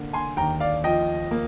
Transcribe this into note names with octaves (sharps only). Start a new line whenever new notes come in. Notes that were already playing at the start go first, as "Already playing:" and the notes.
Already playing: D3 A#3
G#5 C6
D#2 G5 A#5
D5 F5
F3 D#5 G5
A#3